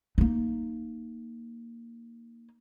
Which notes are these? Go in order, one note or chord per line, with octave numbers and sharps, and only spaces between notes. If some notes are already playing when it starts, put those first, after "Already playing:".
A#3 D#4